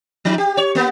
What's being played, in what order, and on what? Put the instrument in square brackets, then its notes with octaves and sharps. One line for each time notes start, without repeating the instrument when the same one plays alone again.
[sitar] F3 D#4
G4
C#5
A#3 B3